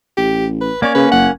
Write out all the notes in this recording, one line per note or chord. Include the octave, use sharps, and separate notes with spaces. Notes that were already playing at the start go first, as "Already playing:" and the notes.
A1 G4
B4
A#3 C#4 C#5 D5
C#3 B4
F#1 F#5